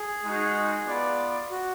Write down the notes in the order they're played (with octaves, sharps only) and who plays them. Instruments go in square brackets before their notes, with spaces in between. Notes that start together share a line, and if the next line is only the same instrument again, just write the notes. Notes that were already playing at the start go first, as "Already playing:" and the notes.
Already playing: [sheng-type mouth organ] G#4
[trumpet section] G#3 D#4 F#4
B3 F4 B4 D5
[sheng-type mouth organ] F#4